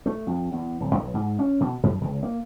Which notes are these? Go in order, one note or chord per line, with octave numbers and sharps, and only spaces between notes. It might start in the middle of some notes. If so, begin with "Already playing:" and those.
A3
F2
E2
D1
B1
G#2
C#4
B2
F#2
C#2
A#3